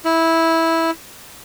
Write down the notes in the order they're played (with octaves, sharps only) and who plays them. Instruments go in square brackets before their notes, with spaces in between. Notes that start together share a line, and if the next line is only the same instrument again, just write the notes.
[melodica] E4